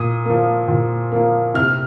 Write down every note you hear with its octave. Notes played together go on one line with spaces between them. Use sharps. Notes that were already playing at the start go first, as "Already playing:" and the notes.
Already playing: A#2 D#6
F3 A#3
A#2
F3 A#3
C3 F6